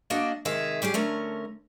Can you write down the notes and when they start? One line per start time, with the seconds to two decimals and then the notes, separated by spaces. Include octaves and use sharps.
0.10 A#3 D4 F#4 D#5 F#5
0.45 C3 D#3 G#3 G#4 E5
0.82 G3 C#4 G4 G#4
0.94 D3 A3 C#4 A#4